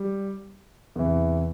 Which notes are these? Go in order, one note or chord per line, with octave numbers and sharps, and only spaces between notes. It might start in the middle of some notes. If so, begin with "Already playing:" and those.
Already playing: G3
E2 C3 E3